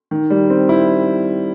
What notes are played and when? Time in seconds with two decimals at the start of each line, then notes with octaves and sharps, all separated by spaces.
0.11 D#3
0.30 G3
0.50 C4
0.69 E4